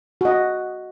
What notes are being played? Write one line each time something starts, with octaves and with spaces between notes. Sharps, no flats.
F#4 D#5